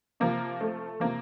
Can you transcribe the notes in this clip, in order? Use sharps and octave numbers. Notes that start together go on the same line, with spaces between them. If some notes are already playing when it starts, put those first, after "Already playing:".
C3 F3 A#3
A3
C3 F3 A#3